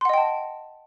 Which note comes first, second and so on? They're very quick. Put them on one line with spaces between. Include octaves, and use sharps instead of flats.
C6 F#5 D#5 G5 A5